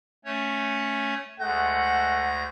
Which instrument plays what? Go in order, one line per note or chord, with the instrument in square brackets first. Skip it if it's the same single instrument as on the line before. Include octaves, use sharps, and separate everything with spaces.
[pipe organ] A3 C#4 C#5
[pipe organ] D2 G6 A#6 [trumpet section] G#3 A3 F#5